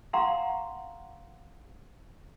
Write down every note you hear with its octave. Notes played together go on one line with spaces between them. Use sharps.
F5 F#5 A#5 C6 C#6